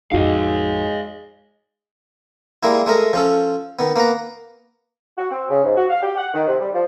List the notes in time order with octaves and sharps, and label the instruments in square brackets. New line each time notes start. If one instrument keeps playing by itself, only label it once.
[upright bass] A1 F2 [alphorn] G#3 [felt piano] D#4 F#4 [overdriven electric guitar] D#5 F5
[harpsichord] G3 G#3 A#3 E4
G#3 A3 A#4 D#5
F3 C#4 A4
D#3 B3
A#3 B3 F#5 A#5
[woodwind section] F#4
C4
C#3
G#2
F#4
F5
G4
F#5
D#3
C3
G3
F3